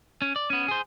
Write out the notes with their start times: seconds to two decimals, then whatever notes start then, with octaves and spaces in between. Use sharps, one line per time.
0.22 C#4
0.36 D5
0.50 B3 C#4
0.68 G#4 C5